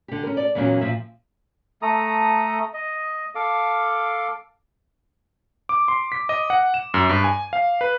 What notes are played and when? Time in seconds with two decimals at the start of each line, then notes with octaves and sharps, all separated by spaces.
0.08 D3 G4
0.23 C#4 A#4
0.37 D5
0.55 E2 A#2 F#3 A#3 C4 C#4
0.81 A#2 F3 E5
1.82 A3 A4 A#5 D#6
2.73 D#5
3.35 A4 F5 D6
5.69 D6
5.88 C6
6.12 B6
6.29 D#5
6.50 F#5
6.74 E7
6.94 F#2
7.09 G2
7.24 G#5
7.53 F5
7.81 B4